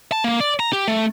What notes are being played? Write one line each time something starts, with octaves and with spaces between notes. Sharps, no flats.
A5
A#3
D5
A#5
G4
A3